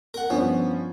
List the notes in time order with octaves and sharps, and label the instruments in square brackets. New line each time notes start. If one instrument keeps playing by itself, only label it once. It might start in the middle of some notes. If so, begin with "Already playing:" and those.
[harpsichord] A#4 F#5
[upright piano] G2 F3 C#4 [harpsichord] B3